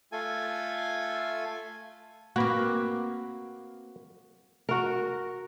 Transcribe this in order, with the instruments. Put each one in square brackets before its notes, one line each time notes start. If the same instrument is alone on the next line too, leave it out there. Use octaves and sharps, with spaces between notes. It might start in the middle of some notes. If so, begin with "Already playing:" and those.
[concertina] A3 F4 A4 G#5
[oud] A#3 C4 [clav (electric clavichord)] F#4 B4
[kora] F#4 A#4